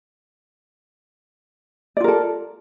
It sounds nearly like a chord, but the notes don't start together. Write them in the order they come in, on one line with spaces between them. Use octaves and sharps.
D5 F4 A#4 A4